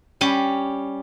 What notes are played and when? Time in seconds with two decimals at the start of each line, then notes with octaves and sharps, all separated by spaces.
0.21 G3 C#4 G4